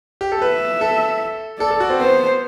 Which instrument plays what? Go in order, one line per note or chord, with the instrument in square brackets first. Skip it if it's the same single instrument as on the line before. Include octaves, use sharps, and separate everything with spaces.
[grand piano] G4
A4
[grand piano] B4 [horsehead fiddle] E5
[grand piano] A4
[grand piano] A4 [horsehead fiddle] D5
[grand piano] A4
F#4
C4
[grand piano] B3 [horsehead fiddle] C5